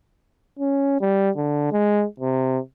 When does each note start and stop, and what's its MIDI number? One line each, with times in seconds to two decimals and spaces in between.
0.59 0.98 61
1.01 1.30 55
1.37 1.70 50
1.72 2.05 56
2.20 2.58 48